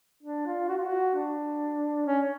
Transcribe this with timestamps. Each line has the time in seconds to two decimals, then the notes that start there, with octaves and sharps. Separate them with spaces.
0.23 D4
0.47 F4
0.68 F#4
0.77 F4
0.87 F#4
1.15 D4
2.07 C#4